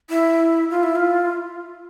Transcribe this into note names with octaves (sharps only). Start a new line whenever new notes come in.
E4
F4
E4
F4